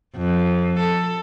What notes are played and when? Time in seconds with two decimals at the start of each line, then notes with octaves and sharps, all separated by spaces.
0.16 F2
0.80 A4